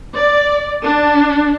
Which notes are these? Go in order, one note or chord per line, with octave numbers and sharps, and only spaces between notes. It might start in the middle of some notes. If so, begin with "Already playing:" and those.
D5
D4